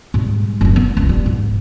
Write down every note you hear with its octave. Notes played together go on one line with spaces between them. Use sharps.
G#2 G3
F#1 G#3
B3
C#2
G3
G#2